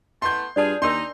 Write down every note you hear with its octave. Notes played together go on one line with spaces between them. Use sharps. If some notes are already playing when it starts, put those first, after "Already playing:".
A3 B3 E4 C6 G6
G2 F4 G#4 D5 A5
D#2 D4 D#4 A#4 C6